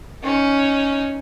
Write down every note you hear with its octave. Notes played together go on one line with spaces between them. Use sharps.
C#4 D#4